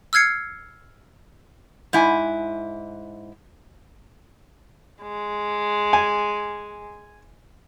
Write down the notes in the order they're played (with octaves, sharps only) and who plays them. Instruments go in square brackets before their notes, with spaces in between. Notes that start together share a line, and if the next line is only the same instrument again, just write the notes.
[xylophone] E6 F6 G#6 C7 C#7
[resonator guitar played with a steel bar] G#2 E4 G#5
[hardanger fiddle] G#3
[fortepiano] G#5